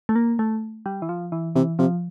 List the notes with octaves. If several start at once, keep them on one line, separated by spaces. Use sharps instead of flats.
A3
A#3
A3
G3
E3
F3
E3
C3 E3
C3 F3